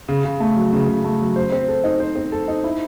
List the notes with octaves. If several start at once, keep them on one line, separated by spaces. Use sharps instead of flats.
C#3
C#3
A3
F#3
C#3
C#3
A3
F#3
C5
C4
A4
D#4
C5
C4
A4
D#4
E4